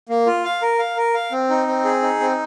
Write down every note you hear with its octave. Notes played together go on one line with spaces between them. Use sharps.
A#3
F4
F5
A#4
F5
A#4
F5
C4
D#4
C4
G#4
D#4
C4